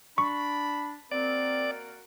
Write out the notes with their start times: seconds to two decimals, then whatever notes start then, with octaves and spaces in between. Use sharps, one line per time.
0.18 D4 B5 C#6
1.11 A#3 C4 F#4 A#4 D5